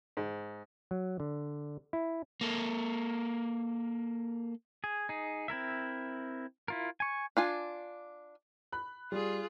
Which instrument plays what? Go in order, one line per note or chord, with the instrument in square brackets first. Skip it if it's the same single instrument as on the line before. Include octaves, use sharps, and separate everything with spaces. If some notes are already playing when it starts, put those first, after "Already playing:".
[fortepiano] G#2
[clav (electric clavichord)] F#3
D3
E4
[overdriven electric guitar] A#3 A4
[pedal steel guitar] G#4
D#4 G#4
C4 E4 A#4 E5
E4 F4 A#4
G#5 C#6
[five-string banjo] D4 F4 G#5
[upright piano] B5 F#6
[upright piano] G3 [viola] F4 G#4